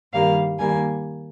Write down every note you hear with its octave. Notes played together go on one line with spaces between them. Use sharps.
G2 D#3 G3 A#3 F5
D#2 D#3 G3 A#3 G#5